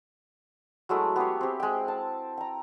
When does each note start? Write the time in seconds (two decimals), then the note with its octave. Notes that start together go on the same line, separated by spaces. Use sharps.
0.89 F#3 G#3 A3 E4
1.16 B3 G4 G#4 C#5
1.41 C4 G4
1.60 G#3 G5
1.88 A5
2.37 G5 A#5